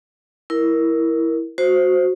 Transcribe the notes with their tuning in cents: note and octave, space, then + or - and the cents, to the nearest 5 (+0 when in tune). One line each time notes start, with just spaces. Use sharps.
E4 +0 A#4 +5
F#4 -10 C5 +0